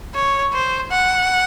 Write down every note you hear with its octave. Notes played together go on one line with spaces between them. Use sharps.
C#5
C5
F#5